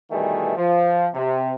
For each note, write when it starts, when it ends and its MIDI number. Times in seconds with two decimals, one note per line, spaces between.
0.11 0.56 47
0.11 0.56 51
0.11 0.56 52
0.11 0.56 55
0.11 0.56 57
0.11 0.56 68
0.56 1.08 53
1.14 1.53 48